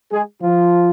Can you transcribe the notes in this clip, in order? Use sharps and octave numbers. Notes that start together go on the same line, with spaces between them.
G#3 G#4
F3 F4